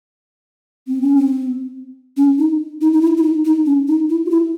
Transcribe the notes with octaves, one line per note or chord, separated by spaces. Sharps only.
C4
C#4
C4
C#4
D#4
D#4
D#4
E4
E4
D#4
D#4
C#4
D#4
E4
F#4
E4